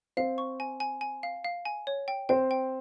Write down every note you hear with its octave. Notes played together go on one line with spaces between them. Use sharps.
C4 C5 F5
C#6
G#5
G#5
G#5
F5
F5
G#5
C#5
G5
C4 C5 G5
G5